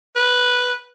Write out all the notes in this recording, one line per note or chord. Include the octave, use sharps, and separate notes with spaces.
B4